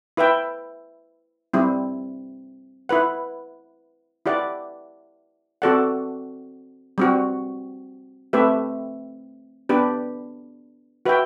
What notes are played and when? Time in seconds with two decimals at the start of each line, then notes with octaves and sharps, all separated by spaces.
0.17 E4 B4 E5 G5
1.54 G3 C4 E4
2.89 E4 B4 F#5
4.26 E4 G4 D5 F#5
5.62 C4 F#4 A4 D5 F#5
6.98 G3 C4 F#4
8.33 A3 C4 G4 B4 E5
9.69 B3 D4 G4 B4
11.06 F#4 B4 E5 G5